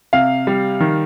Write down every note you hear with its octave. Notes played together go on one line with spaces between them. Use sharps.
C3 F5
G3
D#3